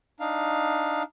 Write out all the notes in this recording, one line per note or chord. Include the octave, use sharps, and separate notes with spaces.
D4 D#4 F5